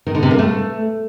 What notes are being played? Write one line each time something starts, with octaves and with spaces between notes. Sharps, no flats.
D#3
D3
C3
A#3
A3